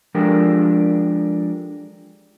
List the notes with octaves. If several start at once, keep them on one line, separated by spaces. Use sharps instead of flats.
F3 G#3 D4 G4 A4 A#4